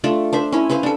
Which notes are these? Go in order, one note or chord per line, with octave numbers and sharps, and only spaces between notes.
A3 D4 F4 D5
D4 C5 E5
C#4 E4
C#4 B4 C5 F5
D4 A4